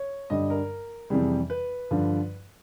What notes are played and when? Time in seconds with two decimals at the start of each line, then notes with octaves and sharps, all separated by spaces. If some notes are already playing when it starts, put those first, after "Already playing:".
Already playing: C#5
0.30 G2 D3 G3 D#5
0.50 A#4
1.10 F2 C3 E3 G3 G#4
1.50 B4
1.91 G2 D3 F3